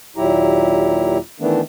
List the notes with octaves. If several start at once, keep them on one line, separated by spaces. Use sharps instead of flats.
D#2 A#2 F#3 E4 G4 A#5
D#3 E3 A3 B3 D4